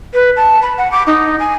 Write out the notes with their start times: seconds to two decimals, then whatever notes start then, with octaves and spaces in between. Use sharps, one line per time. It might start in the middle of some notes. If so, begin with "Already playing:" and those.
0.14 B4
0.37 A5
0.62 B5
0.78 F#5
0.92 D6
1.07 D#4
1.40 G#5